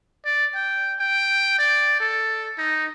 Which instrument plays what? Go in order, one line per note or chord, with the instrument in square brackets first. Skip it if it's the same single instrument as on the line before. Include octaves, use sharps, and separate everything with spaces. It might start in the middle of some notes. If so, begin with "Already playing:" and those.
[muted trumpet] D5
G5
G5
D5
A4
D#4